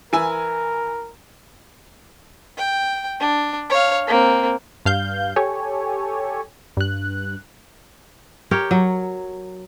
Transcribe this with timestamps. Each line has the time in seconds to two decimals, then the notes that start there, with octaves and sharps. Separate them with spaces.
0.13 E3 A#4 G#5 E6
2.57 G5
3.19 D4
3.69 C#5 F5
4.07 A#3 C4
4.86 G2 F5 G6
5.36 G4 A4 C#5 G#5
6.77 G2 F#6
8.51 G4 A#4 C#5
8.71 F#3